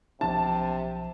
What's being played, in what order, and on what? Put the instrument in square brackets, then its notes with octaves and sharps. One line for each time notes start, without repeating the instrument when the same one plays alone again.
[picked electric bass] B1 F3 D4 [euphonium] C3 [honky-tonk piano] A5